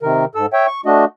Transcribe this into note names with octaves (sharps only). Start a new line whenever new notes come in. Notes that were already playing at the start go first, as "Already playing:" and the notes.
C3 D#3 A#4
G#2 A4 E6
C#5 E5 G5
C#6
A3 D4 F#4 D#5